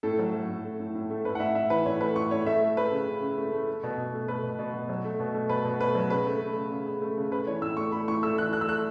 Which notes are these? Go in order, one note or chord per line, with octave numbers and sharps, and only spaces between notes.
A2 A4
F#3
F#3
A2
A3
A2
A2
A3
A2 B4
F#5
A2 E5
A2 E5
E3 B4
A2 C#5
A3 B4
A2 C#6
A2 C#5
A3 E5
A3
A3 B4
C#3
C#3
C#3
A3
A3
A3
B2
B2
A3
A3 B4
B2
B2
B2
F#3
A3
B2
A3
B2 B4
B2
A3 B4
F#3
C#3 B4
A3
A3
C#3
C#3
C#3
A3
C#3
A3 B4
E3 C#5
A2 E6
A3 C#6
A3 B5
A2 C#6
A3 E6
E3 F#6
A3 F#6
E6
A3 F#6